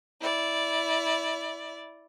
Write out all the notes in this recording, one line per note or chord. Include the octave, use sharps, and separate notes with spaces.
E4 D5